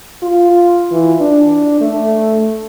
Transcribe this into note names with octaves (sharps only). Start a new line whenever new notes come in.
F4
E3
D4
A3